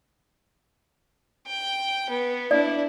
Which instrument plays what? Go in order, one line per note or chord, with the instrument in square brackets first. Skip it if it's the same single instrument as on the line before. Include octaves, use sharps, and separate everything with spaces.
[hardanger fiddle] G5
B3
[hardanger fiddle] D4 E4 [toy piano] D5